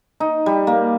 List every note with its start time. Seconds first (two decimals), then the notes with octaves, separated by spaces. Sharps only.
0.20 D#4
0.46 G3
0.67 A#3